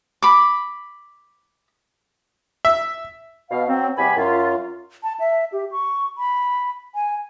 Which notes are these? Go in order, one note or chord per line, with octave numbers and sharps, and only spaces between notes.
B5 D6
E5
B2 F5
F#3 C4
E2 C3 G3 B3 G#5 B5
F#2 F4
A5
E5
G4
C#6
B5
G#5